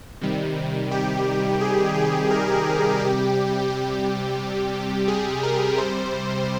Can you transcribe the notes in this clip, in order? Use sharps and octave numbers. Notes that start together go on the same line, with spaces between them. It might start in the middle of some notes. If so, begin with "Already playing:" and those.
C3 D#3 G3
G4
G#4
G#4
A#4
G#4
C3 G3 G4
G4
G#4
A#4
C3 G3 C5